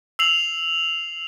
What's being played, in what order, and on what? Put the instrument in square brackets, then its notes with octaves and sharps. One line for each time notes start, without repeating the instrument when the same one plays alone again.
[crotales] E6 C7 F7 F#7